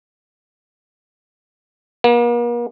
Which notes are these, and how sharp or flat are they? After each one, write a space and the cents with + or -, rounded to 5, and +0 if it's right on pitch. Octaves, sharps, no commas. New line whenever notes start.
A#3 +40